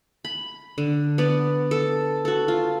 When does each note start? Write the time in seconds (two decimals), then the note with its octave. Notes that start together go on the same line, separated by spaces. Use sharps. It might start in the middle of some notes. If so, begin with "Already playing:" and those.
0.25 B5
0.78 D3
1.18 B3 D5
1.71 A4
2.25 F#4 A4
2.48 F4